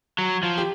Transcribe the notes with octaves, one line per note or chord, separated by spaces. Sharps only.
F#3
F3
G4